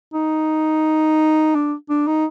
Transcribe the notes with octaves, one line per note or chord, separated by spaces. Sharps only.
D#4
D4
D4
D#4